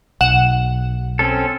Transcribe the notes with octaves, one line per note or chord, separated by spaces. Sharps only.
B1 F#5 E7
C4 C#4 A4